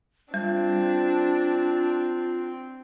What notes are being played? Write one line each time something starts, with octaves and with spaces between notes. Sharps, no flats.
G3 C4 D4 F4